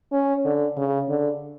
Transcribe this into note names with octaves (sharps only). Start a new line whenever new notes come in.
C#4
D3
C#3
D3